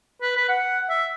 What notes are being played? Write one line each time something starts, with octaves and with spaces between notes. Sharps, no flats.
B4
B4
F#5
E5